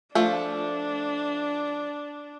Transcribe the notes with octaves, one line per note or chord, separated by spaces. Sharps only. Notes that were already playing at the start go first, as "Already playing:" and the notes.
F3 A3 D4